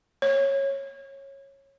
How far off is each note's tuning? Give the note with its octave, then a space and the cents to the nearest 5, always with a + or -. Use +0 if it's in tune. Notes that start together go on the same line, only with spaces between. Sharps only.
C#5 -15